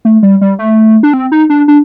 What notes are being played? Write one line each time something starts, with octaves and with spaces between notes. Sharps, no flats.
A3
G3
G3
A3
D4
C4
D#4
D4
D4